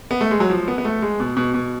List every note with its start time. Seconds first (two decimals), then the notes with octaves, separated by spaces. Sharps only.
0.11 B3
0.21 A3
0.31 G#3
0.40 F#3
0.50 F3
0.68 B3
0.78 B3
0.85 A3
1.02 G#3
1.20 B2
1.37 B2
1.54 B2